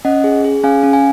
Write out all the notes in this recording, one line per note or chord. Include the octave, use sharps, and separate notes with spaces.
C#4 D#5 F#5
G#4
G#4
C#4 F5 G#5
C#4
F5 G#5